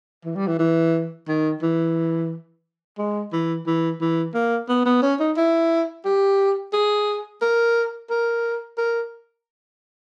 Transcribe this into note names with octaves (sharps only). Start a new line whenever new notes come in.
E3
G3
E3
E3
D#3
E3
G#3
E3
E3
E3
A#3
B3
B3
C#4
D#4
E4
G4
G#4
A#4
A#4
A#4